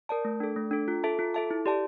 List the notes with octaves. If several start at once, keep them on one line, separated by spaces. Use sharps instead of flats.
A#4 D5 A5
A3
D4 A4
A3
D4 A4
F4
A4 E5 A5
F4
A4 E5 A5
E4
G4 D5 A5